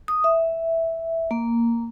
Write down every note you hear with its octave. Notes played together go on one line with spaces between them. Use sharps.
D#6
E5
A#3